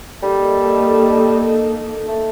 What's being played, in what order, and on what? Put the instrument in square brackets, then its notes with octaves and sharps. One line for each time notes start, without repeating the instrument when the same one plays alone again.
[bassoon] G3 [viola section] A#3 D#4 A4
[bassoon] A3